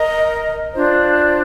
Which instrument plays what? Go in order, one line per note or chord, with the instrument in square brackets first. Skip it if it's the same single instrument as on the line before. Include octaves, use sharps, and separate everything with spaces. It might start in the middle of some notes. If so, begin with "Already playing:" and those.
Already playing: [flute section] A#4 D#5 A#5
D4 F4 C5